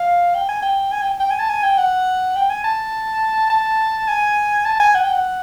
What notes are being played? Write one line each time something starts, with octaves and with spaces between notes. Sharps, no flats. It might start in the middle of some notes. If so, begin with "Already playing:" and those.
Already playing: F5
G5
G#5
G5
G#5
G5
G5
G#5
A5
G#5
G5
F#5
G5
G#5
A5
A5
G#5
A5
G#5
F#5
G5
F#5